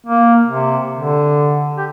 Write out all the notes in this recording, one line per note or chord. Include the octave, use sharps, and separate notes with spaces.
A#3
C3
D3
G4